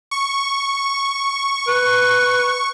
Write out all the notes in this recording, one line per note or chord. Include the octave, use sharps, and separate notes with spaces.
C#6
B4